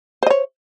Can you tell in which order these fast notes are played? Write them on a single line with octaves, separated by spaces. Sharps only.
C5 D#5 C#5